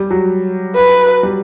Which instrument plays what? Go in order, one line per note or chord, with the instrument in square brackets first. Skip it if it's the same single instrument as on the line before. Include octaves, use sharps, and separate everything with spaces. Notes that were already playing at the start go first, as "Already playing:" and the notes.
Already playing: [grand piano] G3
F#3
[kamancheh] B4
[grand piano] G3